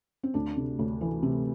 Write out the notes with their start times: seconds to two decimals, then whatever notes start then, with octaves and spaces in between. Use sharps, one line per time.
0.23 C4
0.34 D2 D4
0.57 C3
0.79 D2
1.01 E3
1.23 C3